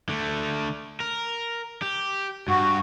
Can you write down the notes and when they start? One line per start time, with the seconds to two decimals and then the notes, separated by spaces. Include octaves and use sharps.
0.09 D3 A3
1.00 A#4
1.82 G4
2.48 G2 F#4